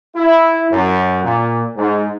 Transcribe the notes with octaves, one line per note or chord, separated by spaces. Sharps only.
E4
F#2
A#2
G#2